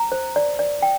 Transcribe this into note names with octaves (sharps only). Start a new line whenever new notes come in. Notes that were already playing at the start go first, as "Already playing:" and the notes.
Already playing: A#5
C5
D5
D5
G5